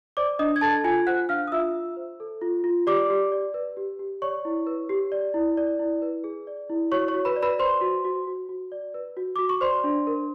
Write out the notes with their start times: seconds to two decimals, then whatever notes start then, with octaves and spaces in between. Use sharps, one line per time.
0.17 C5 D5 D6
0.39 D4 D#5 D#6
0.56 G#6
0.61 A4 A5 A6
0.84 F4 G#5 G#6
1.07 C5 F#5 F#6
1.29 D4 F5 F6
1.47 D#6
1.52 F4 E5 E6
1.74 F4
1.97 C5
2.20 A4
2.42 F4
2.64 F4
2.87 G4 D5 D6
3.10 G4
3.32 D5
3.54 B4
3.77 G4
3.99 G4
4.22 C#5 D5 C#6
4.45 E4
4.67 B4
4.89 G4
5.12 D5
5.34 E4
5.57 D5
5.79 E4
6.02 B4
6.24 G#4
6.47 D5
6.69 E4
6.92 F#4 C#5 C#6
7.08 C#5 C#6
7.14 F#4
7.25 B4 B5
7.36 D5
7.43 B4 B5
7.59 B4 C5 C6
7.81 F#4
8.05 F#4
8.27 F#4
8.49 F#4
8.72 D5
8.94 B4
9.17 F#4
9.36 F#4 D6
9.49 C#6
9.61 C5 D5 C6
9.84 D4
10.07 A#4